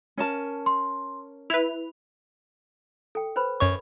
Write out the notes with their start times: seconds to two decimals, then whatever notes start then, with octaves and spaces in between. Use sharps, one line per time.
0.17 C#4 A#4 A5
0.66 C6
1.50 E4 B4 F7
3.15 A4 G5
3.36 B4 C5 B5
3.60 F#2 C#5 C#6